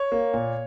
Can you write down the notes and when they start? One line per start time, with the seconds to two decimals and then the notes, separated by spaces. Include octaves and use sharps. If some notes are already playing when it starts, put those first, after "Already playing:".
Already playing: C#5
0.12 A#3
0.34 A#2